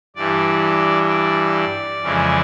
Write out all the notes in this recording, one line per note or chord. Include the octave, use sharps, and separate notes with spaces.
G2 E3 G3 D5
D5
F2 C#3 E3 G#3